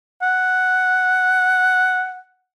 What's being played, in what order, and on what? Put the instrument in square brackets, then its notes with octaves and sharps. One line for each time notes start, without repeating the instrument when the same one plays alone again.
[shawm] F#5